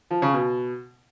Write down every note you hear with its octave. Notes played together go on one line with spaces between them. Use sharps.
F3
C#3
B2